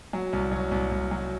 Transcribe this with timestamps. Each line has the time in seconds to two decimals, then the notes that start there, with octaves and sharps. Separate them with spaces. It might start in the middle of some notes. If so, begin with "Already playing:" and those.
0.13 F#3
0.33 C2
0.52 F#3
0.71 C2
0.91 C2
1.11 F#3